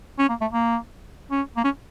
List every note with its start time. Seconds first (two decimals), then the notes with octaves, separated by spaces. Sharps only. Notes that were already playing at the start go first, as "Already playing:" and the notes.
0.19 C#4
0.29 A#3
0.41 A3
0.53 A#3
1.31 C#4
1.57 A#3
1.64 C#4